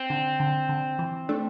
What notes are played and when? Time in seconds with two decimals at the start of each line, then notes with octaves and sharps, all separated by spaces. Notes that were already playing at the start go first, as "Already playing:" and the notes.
Already playing: C4
0.10 D3
0.40 D3
0.69 D3
0.99 E3
1.29 A3 D4